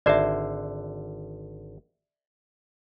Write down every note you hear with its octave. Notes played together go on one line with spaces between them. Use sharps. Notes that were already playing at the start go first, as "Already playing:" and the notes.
G#1 D3 C5 D5 E5